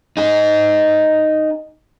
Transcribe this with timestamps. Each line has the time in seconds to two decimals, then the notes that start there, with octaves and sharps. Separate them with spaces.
0.17 D#4 G#4